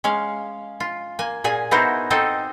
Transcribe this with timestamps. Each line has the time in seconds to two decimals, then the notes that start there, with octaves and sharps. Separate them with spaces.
0.04 G#3 C#4 F5
0.80 F4
1.19 A#3 G#5
1.44 A#2 G#4 G#5
1.71 B3 D#4 E4 F#4 A#4 C5
2.10 C4 D#4 A4 D#5